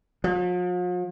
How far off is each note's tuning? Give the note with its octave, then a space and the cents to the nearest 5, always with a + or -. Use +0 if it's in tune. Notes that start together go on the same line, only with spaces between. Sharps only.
F3 +45